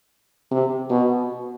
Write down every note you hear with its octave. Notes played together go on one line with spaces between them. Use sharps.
C3
B2